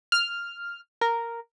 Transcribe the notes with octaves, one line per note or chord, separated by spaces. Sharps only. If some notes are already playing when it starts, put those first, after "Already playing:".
F6
A#4